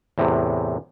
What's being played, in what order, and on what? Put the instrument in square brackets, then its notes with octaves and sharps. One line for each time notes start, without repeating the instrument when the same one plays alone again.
[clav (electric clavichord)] E2 A2 C3